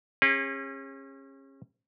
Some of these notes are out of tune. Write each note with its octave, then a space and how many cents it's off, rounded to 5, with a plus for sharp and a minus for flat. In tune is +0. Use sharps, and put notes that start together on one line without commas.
C#4 -30 G#4 -40